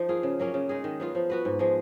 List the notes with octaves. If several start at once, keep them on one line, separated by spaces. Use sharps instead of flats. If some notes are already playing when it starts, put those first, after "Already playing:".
Already playing: F3 D#4
A#3 F4 G#4
C#3
F#3 A#3 C#4
C#3
G#3 D#4 G#4
D#3
F#3 B3 F4
F3
B3 F#4 B4
G#2
F3 G#3